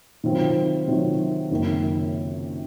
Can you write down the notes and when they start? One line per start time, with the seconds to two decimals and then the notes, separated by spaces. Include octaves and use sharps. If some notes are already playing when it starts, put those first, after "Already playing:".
0.24 C3 D#3 F#3 C4 F4
0.88 C3 D#3 F#3 C4 F4
1.50 F#1 F#2 D#3 A#3